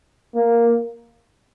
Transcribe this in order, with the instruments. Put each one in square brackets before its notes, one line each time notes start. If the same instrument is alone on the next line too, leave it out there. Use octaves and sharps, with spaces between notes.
[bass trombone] A#3